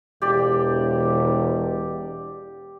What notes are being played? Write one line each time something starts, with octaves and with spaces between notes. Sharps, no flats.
E1 G4 D5